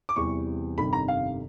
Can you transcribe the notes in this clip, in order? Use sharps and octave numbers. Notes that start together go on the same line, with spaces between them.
D6
E2 C3 E3 G3 C4 C#6
G1 F2 C3 D#3 G3 B5
A#5
F5